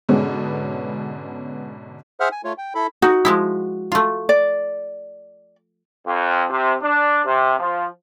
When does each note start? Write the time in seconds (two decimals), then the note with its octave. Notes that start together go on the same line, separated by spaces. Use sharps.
0.09 G#2 B2 D3 G#3 B3 C#4
2.20 G#4 C5 E5 F#5 F6
2.32 G#5
2.44 A3 F4 C#5
2.58 G5
2.75 E4 A4 B5
3.02 D#4 F#4
3.25 F3 G#3 E4
3.92 A3 F4
4.29 D5
6.07 F2
6.50 C3
6.82 D4
7.26 C3
7.60 F3